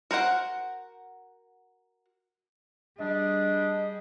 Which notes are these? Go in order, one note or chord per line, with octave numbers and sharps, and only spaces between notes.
F#4 A#4 C5 F#5
G3 D4 G#4 D#5